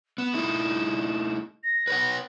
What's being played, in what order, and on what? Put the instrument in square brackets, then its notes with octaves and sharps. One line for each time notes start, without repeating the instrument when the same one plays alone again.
[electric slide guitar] B3 [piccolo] E7
[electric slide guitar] A3 D#4 E4
[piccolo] A#6
[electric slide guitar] B4 C#5 F#5